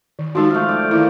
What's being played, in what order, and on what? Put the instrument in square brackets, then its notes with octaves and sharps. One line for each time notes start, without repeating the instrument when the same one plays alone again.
[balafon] D#3
[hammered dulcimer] F3 A4 [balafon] G#3 D#4 F#4
[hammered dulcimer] A3 F5
D5 G5
[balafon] D#3 E4 [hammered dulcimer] A#3